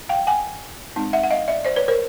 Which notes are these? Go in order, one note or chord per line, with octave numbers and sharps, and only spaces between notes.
F5 G5
F#5 G#5
G#3 C4 D#4
E5 F#5
F#5
D#5 F5
D5 E5
C5 D5
B4 C#5
A#4 C5